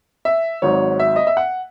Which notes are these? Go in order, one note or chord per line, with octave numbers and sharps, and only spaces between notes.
E5
G#1 G#2 F#3 C#5
E5
D#5
E5
F#5